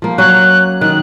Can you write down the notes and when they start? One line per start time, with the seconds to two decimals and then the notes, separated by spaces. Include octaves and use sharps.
0.02 F3 A#3
0.18 F#3 C#4 C#5 F#6
0.81 D#3 F#6